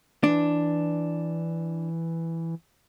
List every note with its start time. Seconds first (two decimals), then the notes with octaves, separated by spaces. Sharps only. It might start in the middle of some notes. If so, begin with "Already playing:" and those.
0.24 E3 D4